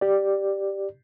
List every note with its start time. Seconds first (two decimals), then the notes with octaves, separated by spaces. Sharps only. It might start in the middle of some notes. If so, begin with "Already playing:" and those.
0.01 G4 D5